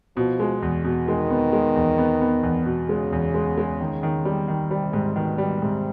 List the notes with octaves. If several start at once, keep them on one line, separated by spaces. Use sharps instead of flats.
B2 F3
G#3
E2
B2
D#3 G#3
B3
G#3
E2
B3
B3
E2
B2
C#3 G#3
E2
G#3
G#3
D#3
D#3
G3
D#3
C3 G3
G#2
B2 D#3
G3
G#2 C3